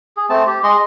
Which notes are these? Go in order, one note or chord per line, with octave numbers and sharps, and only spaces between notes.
G#4
A3 C4 A5
G4
G#3 D#5 C6